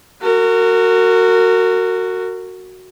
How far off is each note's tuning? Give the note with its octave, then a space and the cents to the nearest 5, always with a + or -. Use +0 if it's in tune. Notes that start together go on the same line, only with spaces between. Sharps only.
F#4 +0 A#4 -30